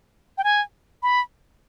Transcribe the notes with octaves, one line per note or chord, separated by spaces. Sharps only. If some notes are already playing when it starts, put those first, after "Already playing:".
G5
G#5
B5